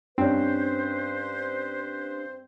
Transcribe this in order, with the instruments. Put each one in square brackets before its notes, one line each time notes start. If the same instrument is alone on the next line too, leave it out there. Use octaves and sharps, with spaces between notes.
[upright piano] G2 C#4 [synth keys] C4 [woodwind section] B4 C5